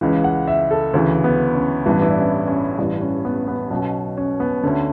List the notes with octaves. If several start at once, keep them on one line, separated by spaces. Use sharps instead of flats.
C#2 C#3 E3
F#5
E5
A4
D2 C#3 E3
B3
C#4
A1 G2 E3 B3
E4
D4
C#4
C#4
A1 G2 E3 D4
C#4
B3
B3
B1 B2 C#4
C#4
B3
D2 D3 C#4